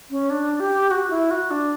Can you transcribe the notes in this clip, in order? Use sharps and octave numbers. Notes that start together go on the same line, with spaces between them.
C#4
D4
G4
F#4
E4
F#4
D4